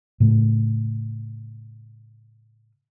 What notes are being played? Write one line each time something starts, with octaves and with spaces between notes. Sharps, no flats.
A2 C#3 A3